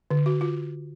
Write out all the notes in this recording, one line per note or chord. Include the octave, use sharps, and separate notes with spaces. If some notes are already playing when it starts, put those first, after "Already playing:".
D3
F#4
F4